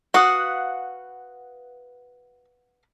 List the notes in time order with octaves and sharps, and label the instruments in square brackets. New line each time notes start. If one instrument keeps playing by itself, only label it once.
[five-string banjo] F#4 [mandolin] B4 F5 F#5 [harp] C#6 D#6